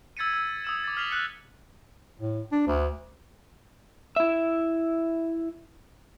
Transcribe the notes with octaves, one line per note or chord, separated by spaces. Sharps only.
E6 G#6 A6 B6 C#7 D#7
E6
D#6 E6 E7
D6 A6
F6 B6 C7 F7 F#7
F6 F#6 C#7
A2
D4
D2
E4 E5